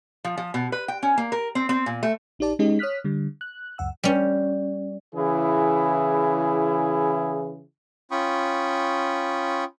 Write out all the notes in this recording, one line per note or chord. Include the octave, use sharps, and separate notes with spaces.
F3
F3
B2
B4
G5
C#4
A#3
A#4
C4
C4
A#2
A3
A#1 D#4 G4 D5 A5
G#3 C#4 D#4 G4 G#4 D#5
C#5 D#6 F6 F#6 B6
D3 G3
F#6
C#2 F#2 F#5 E6
G3 C#4
C#3 E3 E4 G#4
C#4 F4 G5 B5 C#6 D#6